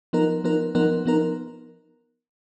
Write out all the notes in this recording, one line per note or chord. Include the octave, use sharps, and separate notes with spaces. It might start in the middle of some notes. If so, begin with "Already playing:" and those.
F3 B3 D#4 A#4
F3 B3 D#4 A#4
F3 B3 D#4 A#4
F3 B3 D#4 A#4